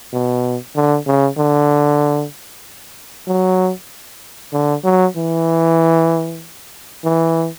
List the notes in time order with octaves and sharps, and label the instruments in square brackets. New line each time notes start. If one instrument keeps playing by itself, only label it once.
[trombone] B2
D3
C#3
D3
F#3
D3
F#3
E3
E3